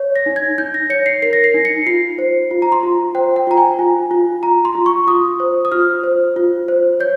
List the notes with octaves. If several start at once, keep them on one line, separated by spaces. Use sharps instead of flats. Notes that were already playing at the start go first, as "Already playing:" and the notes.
Already playing: C#5
A#6
D#4
G#6
D#4 G6
A#6
C#5 C#7
C7
A#4 C7
A#6
C7
D#4
C#7
F4 C7
C5
F4
A#5
C6
F4
C5 G5
G5
F4 A#5
G#5
F4
F4
F4 A#5
C6
F4
C#6
F4 D#6
C5
D#6
F4 F6
C5
F4
C5
C#5 G6